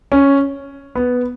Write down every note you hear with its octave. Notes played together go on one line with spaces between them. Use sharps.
C#4
B3